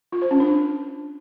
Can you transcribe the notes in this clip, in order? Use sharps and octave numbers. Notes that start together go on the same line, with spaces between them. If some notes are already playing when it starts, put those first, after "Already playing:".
F4
C5
C#4
D4